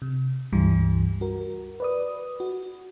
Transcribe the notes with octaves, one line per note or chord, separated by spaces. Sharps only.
C3
C#2 G2 E3 G3
F#4 A#4
B4 D5 D#6
F#4